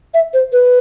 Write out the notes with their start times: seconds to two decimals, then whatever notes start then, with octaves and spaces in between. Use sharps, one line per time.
0.14 E5
0.34 C5
0.53 B4